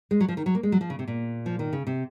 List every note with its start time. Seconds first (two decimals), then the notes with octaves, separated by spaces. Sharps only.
0.11 G#3
0.21 F#3
0.29 F3
0.37 D#3
0.46 F#3
0.55 A#3
0.63 G#3
0.72 F#3
0.81 F3
0.90 C#3
0.99 C3
1.08 A#2
1.46 F3
1.59 D#3
1.73 C#3
1.87 C3